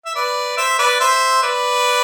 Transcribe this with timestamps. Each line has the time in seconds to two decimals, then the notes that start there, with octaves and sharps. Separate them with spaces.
0.06 E5
0.15 B4 D5
0.57 C5 E5
0.78 B4 D5
1.00 C5 E5
1.42 B4 D5